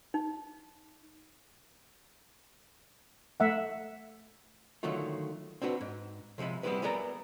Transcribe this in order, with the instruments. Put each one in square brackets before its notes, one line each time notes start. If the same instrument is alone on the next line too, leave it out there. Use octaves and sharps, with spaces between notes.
[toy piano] D#4
[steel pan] A3 E5 F#5
[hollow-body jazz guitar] D3 D#3 F#3 A3 F4
C4 D4 F#4 B4
G#2
C3 F3 G#3 E5 B5
G3 B3 C4 E4 G#4 B4
B3 G#4 A#4 B4 D5 A#5